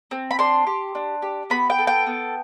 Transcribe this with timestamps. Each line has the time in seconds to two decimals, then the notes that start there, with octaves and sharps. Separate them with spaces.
0.11 C4
0.31 B5
0.39 D4 C6
0.67 G4
0.95 D4
1.22 G4
1.50 B3 B5
1.70 G5
1.78 A4
1.87 G5
2.06 B3